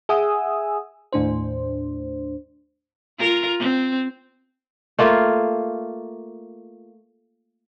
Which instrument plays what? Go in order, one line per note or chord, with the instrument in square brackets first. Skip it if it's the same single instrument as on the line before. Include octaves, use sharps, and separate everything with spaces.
[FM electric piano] G#4 E5 F#5 G#5 D#6 E6
D#2 A2 D4 C5
[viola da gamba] F4 A#4
C4
[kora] A3 A#3 F4